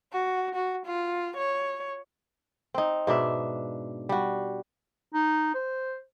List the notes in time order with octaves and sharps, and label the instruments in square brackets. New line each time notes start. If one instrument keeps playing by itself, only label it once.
[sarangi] F#4
F#4
F4
C#5
[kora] C4 D#4
G#2 B2 D4 E5
G3 F#4
[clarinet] D#4
C5